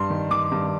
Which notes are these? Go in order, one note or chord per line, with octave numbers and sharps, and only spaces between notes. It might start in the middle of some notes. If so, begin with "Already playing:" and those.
Already playing: G2 C6
D#3
D#3 D6
G2